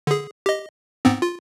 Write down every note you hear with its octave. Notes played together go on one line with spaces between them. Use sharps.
D3 G#4
G4 D#5
G#2 B3 C4
F4